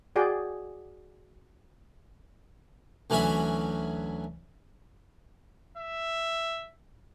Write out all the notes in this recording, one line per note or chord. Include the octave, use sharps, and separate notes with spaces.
F#4 G#4 D5 G5
D2 E3 F#3 C#4 E5 B5
E5